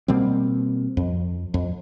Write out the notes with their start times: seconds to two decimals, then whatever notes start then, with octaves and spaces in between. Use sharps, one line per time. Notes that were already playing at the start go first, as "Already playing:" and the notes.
0.08 B2 G3 A#3 C4
0.97 F2
1.54 F2